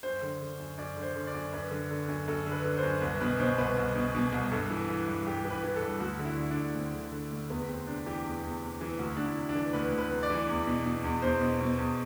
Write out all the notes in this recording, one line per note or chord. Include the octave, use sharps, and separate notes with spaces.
F#2 C5
D3
D3
F#2
F#2 D5
D3
C5
D3
D5
F#2
F#2 B4
D3
D3
F#2
F#2 A4
D3
B4
D3
C5
F#2
C2 B4
B2 B4
B2 C5
C2 B4
C2
B2
B2
C2
G2 A4
E3
E3
G2
G2 G4
E3
B4
E3
A4
G2
D2 F#4
D3
E4
D3
D4
D2
D2 C4
D3
D3
D2
E2 B3
E2 C4
C3 D4
E3 G4
E2
E2
C3
E3
D2 F#4
D2 D4
E4
C3
D4
E3
D2 B4
D2
B4
C3
D5
E3
E2
B2
B2
E2
E2 C5
B2
B2
E2